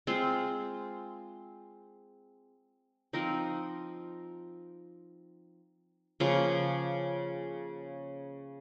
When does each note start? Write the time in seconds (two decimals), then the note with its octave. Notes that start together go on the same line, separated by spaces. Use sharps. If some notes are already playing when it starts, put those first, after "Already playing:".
0.07 G#3 C4 F4
3.13 F3 C4 D#4 A#4
6.20 C#3 F3 A#3